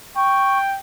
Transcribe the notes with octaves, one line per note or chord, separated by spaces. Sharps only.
G5 C#6